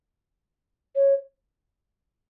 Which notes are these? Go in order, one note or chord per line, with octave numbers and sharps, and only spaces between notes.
C#5